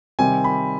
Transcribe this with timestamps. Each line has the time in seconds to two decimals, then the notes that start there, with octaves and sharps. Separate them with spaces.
0.19 C3 D#3 G3 C4 G#5
0.44 B5